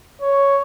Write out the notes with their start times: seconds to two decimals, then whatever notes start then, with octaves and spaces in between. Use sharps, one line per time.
0.22 C#5